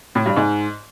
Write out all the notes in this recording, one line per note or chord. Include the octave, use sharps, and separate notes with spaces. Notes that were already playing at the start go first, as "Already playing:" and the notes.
A2
G2
G#2